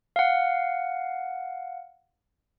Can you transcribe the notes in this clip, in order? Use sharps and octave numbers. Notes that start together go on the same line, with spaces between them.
F5 F#5